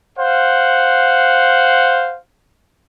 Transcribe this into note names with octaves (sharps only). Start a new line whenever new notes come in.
C5 F5 F#5